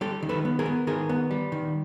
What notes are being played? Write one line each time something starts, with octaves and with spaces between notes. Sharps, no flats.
G3 G4 A4
D#3
A4 B4
B3
G#4 A#4
B3
D#3 G#4 A#4
B3
G3
D#3